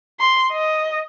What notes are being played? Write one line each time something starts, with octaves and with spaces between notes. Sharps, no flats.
C6
D#5